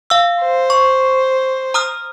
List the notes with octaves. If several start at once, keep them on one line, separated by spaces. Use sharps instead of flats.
F5 E6
C5
C#6
A#5 D#6 F6